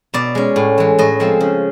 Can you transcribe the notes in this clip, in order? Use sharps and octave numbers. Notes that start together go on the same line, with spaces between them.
B2 D5
G#3 C#4
A2
E3 G#3
A2 D#5
F3 G#3 C4
C#3